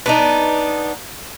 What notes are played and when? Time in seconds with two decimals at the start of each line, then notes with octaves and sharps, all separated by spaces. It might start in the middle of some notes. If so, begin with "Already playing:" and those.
0.06 B3 D4 D#4